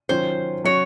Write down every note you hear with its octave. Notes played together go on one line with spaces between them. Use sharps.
D#3 F#3 C#4 F4 C5
F#3 C#4 F#4 C#5